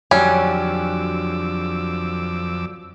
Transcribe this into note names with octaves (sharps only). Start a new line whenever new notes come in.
F2 D3 F#3 G3 C#4 D6 E6